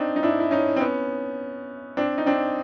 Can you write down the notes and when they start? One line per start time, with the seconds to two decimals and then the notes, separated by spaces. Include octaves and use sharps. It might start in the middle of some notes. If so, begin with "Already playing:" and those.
Already playing: C4 D4 D#4
0.16 D#4
0.23 D4 E4
0.40 E4
0.51 C#4 D#4
0.76 C4
0.80 B3 C#4
1.97 C4 D4
2.18 D#4
2.26 C4 D4